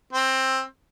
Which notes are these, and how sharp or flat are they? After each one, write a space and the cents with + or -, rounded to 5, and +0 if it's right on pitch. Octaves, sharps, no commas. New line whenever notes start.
C4 +15